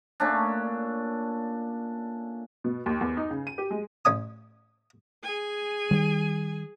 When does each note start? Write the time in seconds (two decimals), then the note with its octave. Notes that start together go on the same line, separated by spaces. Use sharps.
0.20 A#2 A3 C#4 D4
2.64 B2
2.86 D#2
3.01 E2
3.17 D#4
3.31 C#3
3.47 D#7
3.58 G4
3.71 G#3
4.05 A1 C#4 G#5 D#6
5.23 G#4 G#5
5.91 D#3 G3